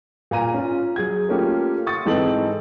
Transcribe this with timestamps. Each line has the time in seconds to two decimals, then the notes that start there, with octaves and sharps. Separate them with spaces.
0.31 A#2 G#5 A#5 D#7
0.54 C#4 F4
0.96 F#3 G#4 G#6
1.29 A3 A#3 C#4 F4 G4
1.86 C6 C#6 D#6 A6
2.06 G#2 E3 C4 D#4 A4 F#7